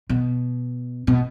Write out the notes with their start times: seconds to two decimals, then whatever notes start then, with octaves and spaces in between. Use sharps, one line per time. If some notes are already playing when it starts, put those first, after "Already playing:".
0.09 B2
1.07 B2